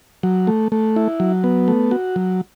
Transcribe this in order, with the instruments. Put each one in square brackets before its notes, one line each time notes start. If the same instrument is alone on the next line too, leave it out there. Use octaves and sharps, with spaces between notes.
[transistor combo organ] F#3
A3
A3
E4
F#3
B3
A3
F#4
F#3